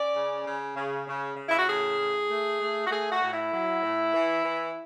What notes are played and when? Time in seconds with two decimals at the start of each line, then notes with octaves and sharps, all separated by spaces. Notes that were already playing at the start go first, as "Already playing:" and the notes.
Already playing: C#4 D5
0.14 C#3
0.45 C#3
0.75 C#3
1.06 C#3
1.36 C#3
1.48 E4
1.57 F#4
1.67 A2 G#4
1.98 A2
2.29 A3
2.59 A3
2.85 F#4
2.90 A3 G#4
3.11 F#4
3.21 A2
3.31 E4
3.51 F#3
3.82 A2
4.13 E3
4.43 E3